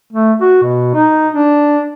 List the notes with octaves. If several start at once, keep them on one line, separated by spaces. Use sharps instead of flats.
A3
F#4
B2
D#4
D4